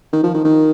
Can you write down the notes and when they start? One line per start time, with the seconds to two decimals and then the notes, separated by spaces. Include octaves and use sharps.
0.13 D#3
0.23 F3
0.34 D#3
0.44 D#3